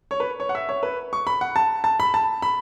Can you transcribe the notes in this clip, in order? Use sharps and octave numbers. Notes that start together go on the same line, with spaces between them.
C#5
B4
C#5
F#5
E5
C#5
B4
C#6
B5
F#5
A5
A5
B5
A5
B5